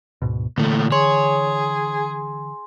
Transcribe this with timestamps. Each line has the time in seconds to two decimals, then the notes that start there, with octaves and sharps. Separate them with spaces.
0.22 D2 G#2 B2
0.58 A#2 D3 E3 A3
0.92 G#4 C#5 C6